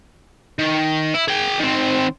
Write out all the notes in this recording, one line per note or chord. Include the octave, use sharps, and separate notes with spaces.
D#3
E4
G#4 G5
D#3 C4